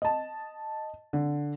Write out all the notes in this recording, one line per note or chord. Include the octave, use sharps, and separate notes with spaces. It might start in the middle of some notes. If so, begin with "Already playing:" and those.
D#5 A5
D3